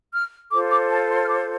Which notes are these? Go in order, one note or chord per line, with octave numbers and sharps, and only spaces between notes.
F6
F4 A4 C5 D6
D6
A5
C6
F6
D6